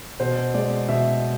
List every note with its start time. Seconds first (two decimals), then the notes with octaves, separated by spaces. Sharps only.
0.20 B2 C5
0.54 G#3 D5
0.89 B2 E5